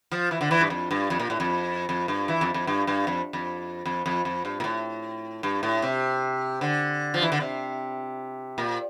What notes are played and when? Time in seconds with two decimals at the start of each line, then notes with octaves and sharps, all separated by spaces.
0.11 F3
0.31 E3
0.41 D3
0.51 E3
0.61 G2
0.70 F2
0.91 G2
1.10 F2
1.20 A#2
1.30 A2
1.40 F2
1.89 F2
2.08 G2
2.28 E3
2.41 F2
2.54 F2
2.67 G2
2.87 G2
3.07 F2
3.33 F2
3.86 F2
4.06 F2
4.25 F2
4.45 G2
4.60 A#2
4.64 A2
5.43 G2
5.63 A2
5.82 C3
6.61 D3
7.14 F3
7.22 E3
7.32 D3
7.40 C3
8.58 A#2